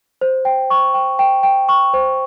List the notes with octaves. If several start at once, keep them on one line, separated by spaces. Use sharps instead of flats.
C5
G5
C#6
G5
G5
G5
C#6
C5